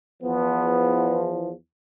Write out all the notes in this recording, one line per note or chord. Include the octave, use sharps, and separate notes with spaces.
E2 F3 B3